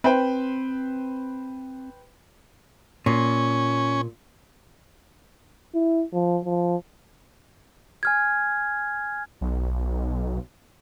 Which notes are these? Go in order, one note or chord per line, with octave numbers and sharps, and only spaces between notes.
C4 B4 C5 G5
A#2 C#4
E4
F3
F3
G#5 F6 G#6
B1